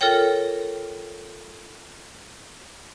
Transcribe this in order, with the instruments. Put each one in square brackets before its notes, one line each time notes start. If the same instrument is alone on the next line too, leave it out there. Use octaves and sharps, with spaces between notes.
[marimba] F4 A4 A#4 C#5 G5